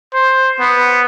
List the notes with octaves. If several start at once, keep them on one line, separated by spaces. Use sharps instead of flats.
C5
B3